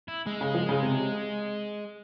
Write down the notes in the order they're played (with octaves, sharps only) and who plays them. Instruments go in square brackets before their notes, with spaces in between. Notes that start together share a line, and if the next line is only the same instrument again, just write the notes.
[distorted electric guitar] E4
G#3
[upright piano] C#3
F3
C#3
C3